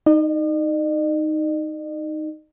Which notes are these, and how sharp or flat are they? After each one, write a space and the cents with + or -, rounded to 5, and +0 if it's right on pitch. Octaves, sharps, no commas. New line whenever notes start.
D#4 +0 D#5 -45